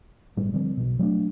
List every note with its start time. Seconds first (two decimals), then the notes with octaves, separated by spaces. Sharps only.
0.37 G1 A2 G3 B3
0.53 D3 F3 G3 C4
0.77 B1 B2
0.99 F#3 A3 C#4 D4